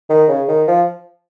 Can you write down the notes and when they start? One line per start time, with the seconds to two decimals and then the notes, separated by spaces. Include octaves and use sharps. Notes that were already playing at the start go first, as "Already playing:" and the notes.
0.09 D#3
0.28 C#3
0.48 D#3
0.68 F3